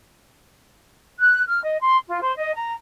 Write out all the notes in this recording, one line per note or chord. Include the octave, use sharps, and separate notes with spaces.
F#6
F6
D#5
C6
F4
C5
D#5
A#5